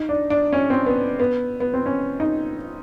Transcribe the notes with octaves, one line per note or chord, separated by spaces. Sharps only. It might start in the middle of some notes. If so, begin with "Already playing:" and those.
Already playing: D#4
D4
D4
C#4
C4
B3
B3
B3
C4
C#4
D#4